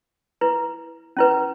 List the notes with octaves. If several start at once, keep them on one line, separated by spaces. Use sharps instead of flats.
E4 B4
C#4 E4 B4